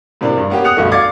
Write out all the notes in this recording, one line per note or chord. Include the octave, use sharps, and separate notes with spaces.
A2 C3 A#3 D4
G2
A#3 B3 C#4 G4
D#6 F#6 C#7 F7
B1 G2 B2 D3 A3
D5 F5 D6 G#6 A6 C#7